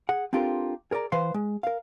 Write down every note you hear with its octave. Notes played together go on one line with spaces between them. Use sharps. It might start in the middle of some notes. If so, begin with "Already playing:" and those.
G#4 F#5
C4 D4 F4 G4 A4 A#4
G#4 A#4 C#5 D5 A#5
E3 B4 C5 F5 C6
G#3
A#4 F5